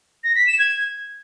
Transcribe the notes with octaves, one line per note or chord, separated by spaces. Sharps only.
A#6
B6
E7
G#6